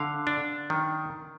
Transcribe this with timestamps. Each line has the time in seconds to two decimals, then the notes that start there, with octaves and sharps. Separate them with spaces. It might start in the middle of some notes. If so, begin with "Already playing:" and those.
Already playing: D3 F5
0.27 D4
0.70 D#3